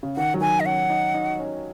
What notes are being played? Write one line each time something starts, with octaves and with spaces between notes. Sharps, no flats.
C#3
D#3 F#5
F#3
D#3 G#5
D#5
C#4 F#5
D#4
D#4
C#4